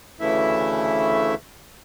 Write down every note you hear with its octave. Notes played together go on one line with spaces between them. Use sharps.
D2 C#3 E3 A3 E4 E5